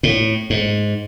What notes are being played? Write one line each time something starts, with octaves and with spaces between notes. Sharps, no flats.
A2
G#2